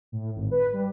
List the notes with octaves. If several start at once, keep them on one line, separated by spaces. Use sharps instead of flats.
A2
G#1
B4
G3